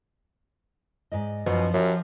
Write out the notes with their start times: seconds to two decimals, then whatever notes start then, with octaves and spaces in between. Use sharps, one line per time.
1.12 G#2 D5 D#5
1.46 F#2 B2 F3 C#4 D#4
1.74 F#2 F#4 G4 C5